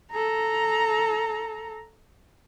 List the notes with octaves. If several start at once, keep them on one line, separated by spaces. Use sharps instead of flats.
A4 A#5